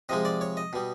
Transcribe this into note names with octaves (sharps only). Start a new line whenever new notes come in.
C3 F3 G#3 D#5
D5
C#5
D#5
B2 G3